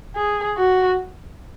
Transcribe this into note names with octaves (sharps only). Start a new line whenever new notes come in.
G#4
F#4